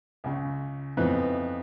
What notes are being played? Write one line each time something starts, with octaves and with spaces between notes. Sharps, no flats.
C#2 C#3
F2 E3 B3 D#4 B4